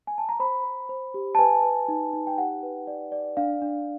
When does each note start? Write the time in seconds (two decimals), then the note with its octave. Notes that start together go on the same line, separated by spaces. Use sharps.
0.07 G#5
0.18 A5
0.29 A#5
0.40 C5 B5
0.64 C5
0.89 C5
1.14 G4
1.35 A5
1.39 B4 G#5
1.63 B4
1.88 D#4
2.13 D#4
2.27 G5
2.38 G4 F#5
2.63 B4
2.87 D5
3.12 D5
3.37 D4 F5
3.62 D4